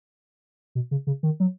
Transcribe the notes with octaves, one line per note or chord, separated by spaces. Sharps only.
B2
C#3
C#3
D#3
F#3